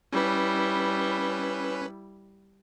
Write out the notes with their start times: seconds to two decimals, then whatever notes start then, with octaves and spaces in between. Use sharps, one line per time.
0.13 G3 C#4 E4 B4